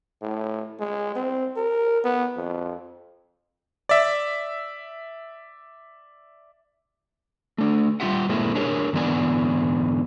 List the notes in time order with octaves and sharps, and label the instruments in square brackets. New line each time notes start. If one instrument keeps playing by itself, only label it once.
[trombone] A2
G#3
C4
A#4
B3
F2
[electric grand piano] D5 E5
[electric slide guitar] A3 D4
G3 A3 F4 G4 E5 F#5
A#2 G#3 A#3 C4 E4
D4 G4 G#4 A#4 C#5
G#2 D3 E3 B3 D5 G#5